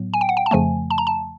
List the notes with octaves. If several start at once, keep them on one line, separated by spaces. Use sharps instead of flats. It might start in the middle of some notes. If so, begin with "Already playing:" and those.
Already playing: A2 F#3 B3
G#5
G5
F#5
G5
A5
F2 C#3 F3 A3 G#5
A5
A#5
A5